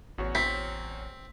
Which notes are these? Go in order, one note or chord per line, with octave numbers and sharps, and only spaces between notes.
A1 E2 F#4 C#5
C4 B6